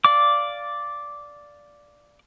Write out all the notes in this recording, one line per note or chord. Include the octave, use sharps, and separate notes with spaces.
D5 F5 D6